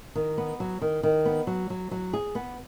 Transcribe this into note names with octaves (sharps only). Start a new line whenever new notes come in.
D#3
B3
F#3
D#3
D#3
B3
F#3
F#3
F#3
G#4
B3